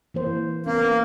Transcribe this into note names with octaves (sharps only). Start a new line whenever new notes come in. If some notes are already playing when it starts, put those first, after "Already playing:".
E3 A#3 C5
A#3 B3 C#4